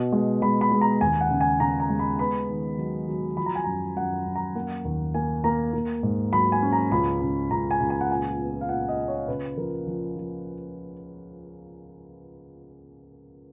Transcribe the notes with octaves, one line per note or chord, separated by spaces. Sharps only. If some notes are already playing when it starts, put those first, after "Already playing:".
Already playing: B2
G#3
G#3 B5
B5
G#3
A#5
D#2 G#5
F#5
C#3
G#5
C#3 A#5
A#5
G#3
B5
B3 B5
D#3
F#3
F#3
F3 B5
A#5
G#5
F#2 A#5
F#2 F#5
F#2
A#5
A#3 F#5
D#2
A#3 G#5
A#3 A#5
A#3
G#2
F#3 B5
G#5
C#4
A#5
C#2 B5
C#2
C#2 A#5
G#5
C#2
G#5
F#5
A#2 G#5
B3
F5
A#2 F#5
D#5
A#2
C#5
C#3 B4
F3 A#4
F3
F3